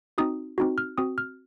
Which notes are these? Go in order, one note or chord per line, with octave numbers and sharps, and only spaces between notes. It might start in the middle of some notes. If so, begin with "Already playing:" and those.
C4 D#4 F#4 D#6
C4 D#4 F#4
F6
C4 F#4 D#6
F6